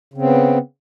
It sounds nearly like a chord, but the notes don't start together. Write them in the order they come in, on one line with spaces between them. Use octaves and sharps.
C#3 C4 B3